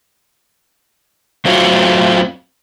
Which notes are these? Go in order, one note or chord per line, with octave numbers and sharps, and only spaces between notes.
F#3 A3 C4 F4 F#4 C#5